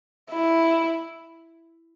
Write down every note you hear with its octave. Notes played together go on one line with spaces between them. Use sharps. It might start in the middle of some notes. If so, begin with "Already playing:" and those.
E4